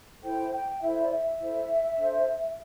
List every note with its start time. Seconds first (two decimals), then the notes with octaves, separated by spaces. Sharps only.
0.23 E4 A4 C5 G5
0.52 G5
0.81 E4 A4 C5 E5
1.02 D5
1.10 E5
1.39 E4 A4 C5
1.96 D4 A4 C5